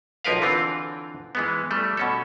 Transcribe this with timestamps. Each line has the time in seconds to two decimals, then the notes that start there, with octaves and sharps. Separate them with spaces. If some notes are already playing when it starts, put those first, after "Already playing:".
0.24 B1 F3 A#4 B4 F5
0.42 D3 E3 C4 F4
1.35 E3 G#3 B3
1.71 G3 A3
1.97 B2 C#4 A4